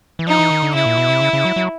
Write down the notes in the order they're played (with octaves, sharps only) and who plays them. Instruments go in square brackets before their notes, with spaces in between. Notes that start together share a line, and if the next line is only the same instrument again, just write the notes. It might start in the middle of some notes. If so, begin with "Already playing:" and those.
[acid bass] E3
[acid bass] F3 [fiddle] D#4
[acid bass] E3
D#3
D3
[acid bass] C#3 [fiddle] E4
[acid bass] A#2
B2
C3
C#3
C#3
F#3
F#3